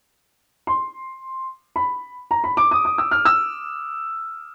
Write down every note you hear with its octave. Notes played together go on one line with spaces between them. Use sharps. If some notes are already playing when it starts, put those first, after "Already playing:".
C6
B5
A#5
B5
D6
D#6
D#6
E6
F6
E6